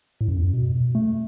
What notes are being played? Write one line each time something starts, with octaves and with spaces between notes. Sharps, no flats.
A2
F#2
E2
F#2
B2
A3